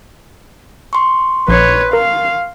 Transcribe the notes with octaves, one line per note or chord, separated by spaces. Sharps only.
C6 C#6
A#1 B4 C#5 C7
A#4 F5